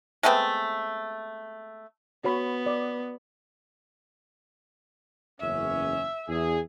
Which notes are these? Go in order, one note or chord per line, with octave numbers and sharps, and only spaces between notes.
G#3 A3 B3 C4
B3 F#4 C#5 B5
D5
F#1 E2 C#4 E5
E2 G#4